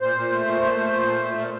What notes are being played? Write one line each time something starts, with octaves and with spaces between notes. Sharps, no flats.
A#2 C5
A#2
A3
A#2
A#2
A3
A#2
A3
A#2
A#2